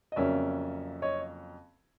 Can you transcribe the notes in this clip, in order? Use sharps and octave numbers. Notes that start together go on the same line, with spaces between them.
D#5
F2 C#3 F#3 A#3 C#4 D5 E5
C#5 D#5